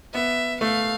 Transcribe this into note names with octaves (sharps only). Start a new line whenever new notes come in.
B3 E5
A3 F5